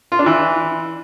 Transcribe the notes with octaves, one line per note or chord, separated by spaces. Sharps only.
F4
D4
E3